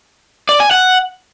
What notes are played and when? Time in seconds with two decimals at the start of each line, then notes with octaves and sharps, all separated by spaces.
0.49 D5
0.60 G#5
0.71 F#5